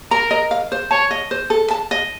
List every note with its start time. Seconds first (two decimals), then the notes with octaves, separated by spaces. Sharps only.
0.11 A#4 A#5
0.31 D#5
0.51 F5
0.72 C5
0.91 C#5 A5
1.11 D#5
1.31 C5
1.50 A4
1.71 A5
1.91 D#5